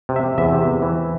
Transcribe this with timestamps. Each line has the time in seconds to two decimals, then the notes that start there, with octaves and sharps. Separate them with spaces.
0.09 C3
0.16 E5
0.23 C3
0.38 E2 E5
0.53 C3
0.67 E2
0.82 E3